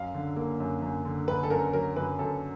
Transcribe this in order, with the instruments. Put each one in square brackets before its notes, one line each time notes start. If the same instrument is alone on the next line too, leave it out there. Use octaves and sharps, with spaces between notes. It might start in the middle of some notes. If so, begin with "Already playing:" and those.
Already playing: [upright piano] F#2 [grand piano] F5
[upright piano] D3
A#3
F#2
F#2
D3
[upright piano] D3 [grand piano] B4
[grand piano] A4
[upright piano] F#2 [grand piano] A#4
[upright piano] F#3 [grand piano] A#4
[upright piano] F#2 [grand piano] B4
[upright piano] F#2 [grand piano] A4